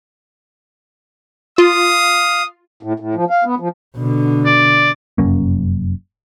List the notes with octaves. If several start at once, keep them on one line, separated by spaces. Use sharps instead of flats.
F4 F5 D#6
A2
A2
F3
F5
B3
F3
B2 D3
D5
F1 F#2 A#3 C#4